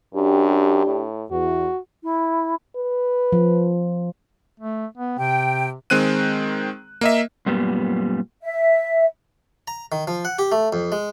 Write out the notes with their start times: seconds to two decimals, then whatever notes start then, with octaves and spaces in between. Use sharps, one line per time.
0.15 F#2 D4 G4
0.87 A2
1.31 E2 F#4
2.03 E4
2.76 B4
3.32 F3
4.60 A3
4.98 B3
5.19 C3 G5
5.90 D#3 G#3 C4 F#6 D#7
7.01 A#3 D#5 E5
7.46 F#2 A#2 G3 B3
8.43 E5
9.68 A#5
9.92 D#3
10.07 F3
10.25 F#5
10.39 G4
10.52 A3
10.73 F2
10.92 G#3